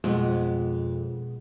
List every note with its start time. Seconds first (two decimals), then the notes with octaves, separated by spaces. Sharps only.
0.04 F2 B2 G#3 B3